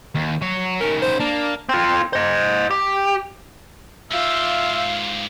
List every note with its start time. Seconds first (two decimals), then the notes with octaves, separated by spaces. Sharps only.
0.15 D#2
0.42 F#3 C#5
0.80 D#3 C#4 A#4
1.02 C5
1.20 A#3 D4
1.69 C4 F4
2.13 C5 D#5
2.71 G4
4.12 G#2 F4 G4 E5 F5